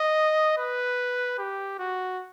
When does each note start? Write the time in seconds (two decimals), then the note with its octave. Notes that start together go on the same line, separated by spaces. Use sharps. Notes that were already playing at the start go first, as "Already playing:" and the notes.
Already playing: D#5
0.58 B4
1.38 G4
1.79 F#4